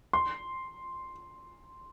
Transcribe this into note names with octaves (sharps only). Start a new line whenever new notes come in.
C6